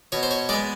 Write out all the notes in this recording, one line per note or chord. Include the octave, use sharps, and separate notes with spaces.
B2 C#5
C5
C#5
G#3 B3 D5